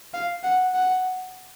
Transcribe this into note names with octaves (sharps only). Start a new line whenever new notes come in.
F5
F#5
F#5